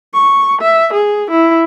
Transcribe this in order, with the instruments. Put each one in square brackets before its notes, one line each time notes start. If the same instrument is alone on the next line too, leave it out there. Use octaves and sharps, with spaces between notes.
[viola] C#6
E5
G#4
E4